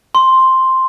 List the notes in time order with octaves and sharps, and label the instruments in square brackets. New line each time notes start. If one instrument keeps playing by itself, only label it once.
[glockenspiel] C6